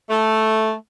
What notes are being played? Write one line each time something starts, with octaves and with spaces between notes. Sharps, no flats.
A3